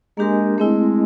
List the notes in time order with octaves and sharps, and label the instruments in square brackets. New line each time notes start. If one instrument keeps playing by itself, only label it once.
[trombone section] G#3 [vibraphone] A#3 D4 G4 A#4
[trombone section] G#3 [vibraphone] A3 C4 E4